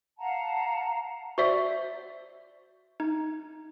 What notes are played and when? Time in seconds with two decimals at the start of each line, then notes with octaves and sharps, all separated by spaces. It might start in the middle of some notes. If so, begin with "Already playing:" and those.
0.19 F5 F#5 A5 A#5
1.38 F#4 C5 D5 E5
3.00 D#4